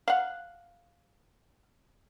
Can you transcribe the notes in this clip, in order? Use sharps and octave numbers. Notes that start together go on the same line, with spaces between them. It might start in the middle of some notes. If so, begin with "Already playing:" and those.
F5 F#5